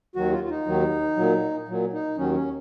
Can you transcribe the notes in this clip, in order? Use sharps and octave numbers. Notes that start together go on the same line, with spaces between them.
D#2 D#3 F#3 F#4
F4
F4
D#4
D#2 D#3 F#3
A#2 F#3
A#2 F#3
D#4
D#2 D#3 F#3 C#4
C#4